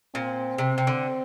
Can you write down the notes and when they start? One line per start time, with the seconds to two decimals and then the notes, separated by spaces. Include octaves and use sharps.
0.15 A#2 C4
0.58 C3
0.78 C3
0.87 D3